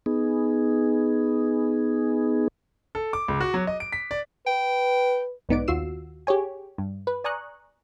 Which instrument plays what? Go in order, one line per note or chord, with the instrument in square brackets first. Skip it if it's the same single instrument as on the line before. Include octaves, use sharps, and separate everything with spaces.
[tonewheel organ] B3 D#4 G#4
[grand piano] A4
D6
C#2
F#4
F#3
D#5
D7
B6
D5
[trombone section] B4 [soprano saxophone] G5
[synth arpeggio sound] B1 G#2 B3 D#4 D5 D7
D#2 F4 F#4 E6 C7 E7
G4 G#4 C#5 G#5
G2
B4
D5 G#5 A#5 C#6 D#6 F#6